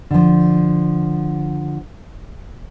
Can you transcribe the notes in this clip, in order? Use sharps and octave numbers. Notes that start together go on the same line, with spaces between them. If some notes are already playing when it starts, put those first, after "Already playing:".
D3 F3